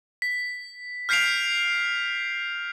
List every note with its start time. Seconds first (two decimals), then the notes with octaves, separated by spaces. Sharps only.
0.22 B6
1.09 F6 G6 B6 C7 D7 F7